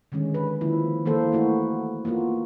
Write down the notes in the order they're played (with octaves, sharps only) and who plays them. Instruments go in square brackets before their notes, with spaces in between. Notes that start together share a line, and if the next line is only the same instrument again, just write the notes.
[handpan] D3 D#3 G#3 C#4
B4
D#3 F3 A#3 E4
E3 A#3 A4 C5
A3 E4 F#4
A#3 B3 F4 F#4